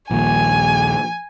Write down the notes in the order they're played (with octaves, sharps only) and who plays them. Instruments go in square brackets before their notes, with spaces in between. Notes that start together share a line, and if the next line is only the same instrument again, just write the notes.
[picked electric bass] A#1 D#2 [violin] G#5